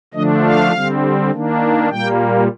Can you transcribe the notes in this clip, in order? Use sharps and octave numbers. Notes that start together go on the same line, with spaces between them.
D3 F3 A3 D4 D#5
F5
D3 G3 C4
D#3 A#3 D4
A#2 G3 A#3 G5